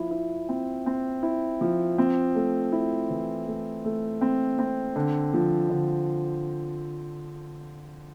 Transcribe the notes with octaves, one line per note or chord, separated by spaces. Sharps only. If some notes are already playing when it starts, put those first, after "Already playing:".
Already playing: F3 E4
E4
C4
C4
E4
F3
C4
A3
E4
E3
A3
A3
C4
C4
D3
F3
D3